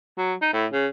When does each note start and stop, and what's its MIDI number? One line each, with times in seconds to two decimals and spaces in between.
0.18 0.34 54
0.42 0.49 63
0.53 0.66 45
0.73 0.87 49